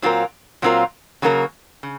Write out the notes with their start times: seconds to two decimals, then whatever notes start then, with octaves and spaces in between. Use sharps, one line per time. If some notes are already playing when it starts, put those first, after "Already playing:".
0.02 A#2 F#3 C4 F4 A#4
0.62 A#2 F#3 C4 F4 A#4
1.22 C#3 F#3 A#3 F4 A#4
1.83 C#3